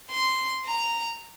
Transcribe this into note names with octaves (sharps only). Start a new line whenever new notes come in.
C6
A#5